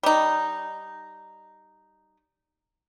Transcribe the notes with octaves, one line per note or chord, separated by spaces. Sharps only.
G3 D#4